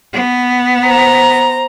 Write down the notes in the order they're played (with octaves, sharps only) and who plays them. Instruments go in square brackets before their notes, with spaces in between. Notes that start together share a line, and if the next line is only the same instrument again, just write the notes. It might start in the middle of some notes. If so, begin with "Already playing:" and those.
[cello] B3
[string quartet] C5 A#5